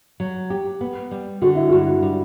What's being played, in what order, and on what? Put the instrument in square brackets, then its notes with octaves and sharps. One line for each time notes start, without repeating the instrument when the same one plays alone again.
[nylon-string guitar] F#3
G4
B3
G3
[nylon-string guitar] D3 [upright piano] F#4
[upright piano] E4
[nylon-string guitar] G2 [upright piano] F#4
[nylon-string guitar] G3